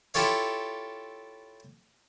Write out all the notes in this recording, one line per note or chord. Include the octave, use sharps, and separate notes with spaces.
E4 F4 G4 A4 C#5 F5